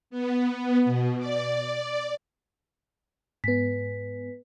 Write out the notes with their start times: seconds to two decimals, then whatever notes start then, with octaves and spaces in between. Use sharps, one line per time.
0.10 B3
0.85 B2
1.18 D5
3.44 G#2 B3 B4 B6